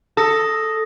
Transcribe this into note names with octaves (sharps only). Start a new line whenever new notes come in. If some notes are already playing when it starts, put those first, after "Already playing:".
A4 D#6 A#6